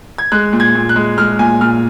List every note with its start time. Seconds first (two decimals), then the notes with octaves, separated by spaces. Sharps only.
0.18 G#6
0.32 G#3 F#6
0.53 A#2
0.60 G#6
0.75 A#2
0.89 F#6
0.96 G#3
1.18 G#3 F6
1.39 A#2 G#5
1.61 A#2 F6